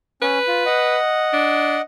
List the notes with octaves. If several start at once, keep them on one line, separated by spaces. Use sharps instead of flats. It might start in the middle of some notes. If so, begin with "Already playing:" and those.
C#4 B4
F4
D#5 F#5
D4